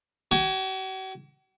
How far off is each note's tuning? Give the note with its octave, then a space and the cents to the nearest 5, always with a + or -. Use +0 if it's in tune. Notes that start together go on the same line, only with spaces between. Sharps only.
F#4 +45 G#5 +0